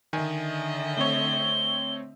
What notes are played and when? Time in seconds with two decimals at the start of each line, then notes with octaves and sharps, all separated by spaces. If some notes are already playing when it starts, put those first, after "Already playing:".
0.13 D3 D#3 D#5 E5 G#5
0.97 A3 C4 C#5 G7